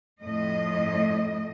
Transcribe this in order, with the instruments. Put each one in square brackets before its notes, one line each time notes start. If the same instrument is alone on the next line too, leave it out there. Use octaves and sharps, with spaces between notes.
[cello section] F2 A2 D#5